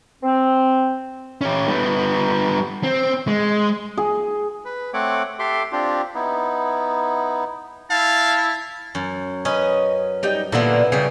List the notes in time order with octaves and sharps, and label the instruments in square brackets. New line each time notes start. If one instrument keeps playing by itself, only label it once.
[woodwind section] C4
[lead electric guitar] C#4 G4
G3 B3
C4
G#3
[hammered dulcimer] G#4
[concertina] B4
A3 C4 C#5 F#5 D6
G4 A4 E5 C6 D6
C4 D4 F4 G4
[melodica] B3 D#4 E4
[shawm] E4 [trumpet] F5 [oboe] A5
[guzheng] F#2
[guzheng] C#4 B4 [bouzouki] D#5
[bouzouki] G3 D#4 G5
[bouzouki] A#2 D3 A#3 [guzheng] B3 E4
[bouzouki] C#3 G3 [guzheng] G#4